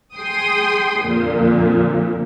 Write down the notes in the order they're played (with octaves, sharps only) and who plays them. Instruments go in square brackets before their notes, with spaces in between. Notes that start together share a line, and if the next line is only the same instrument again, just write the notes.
[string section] G#4 G5 C6 D#6
F2 A#2 D3